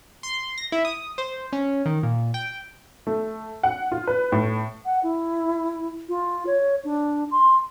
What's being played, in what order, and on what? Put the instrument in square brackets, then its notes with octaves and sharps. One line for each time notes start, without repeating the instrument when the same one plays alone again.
[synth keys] C6
A#6
E4
D#6
C5
C#4
D#3
A#2
G5
[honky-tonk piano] A3
F#5
F4
B4
A2
[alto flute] F#5
E4
F4
C#5
D4
C6